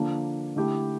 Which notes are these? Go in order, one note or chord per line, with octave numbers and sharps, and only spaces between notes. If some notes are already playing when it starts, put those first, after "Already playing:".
Already playing: D3 F3 A#3 D4
D3 A3 E4 G4